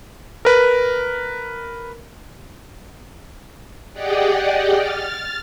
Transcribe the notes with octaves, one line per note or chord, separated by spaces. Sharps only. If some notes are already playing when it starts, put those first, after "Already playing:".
A#4 B4
G4 G#4 D5 D#5 F#5 G5
F6 A6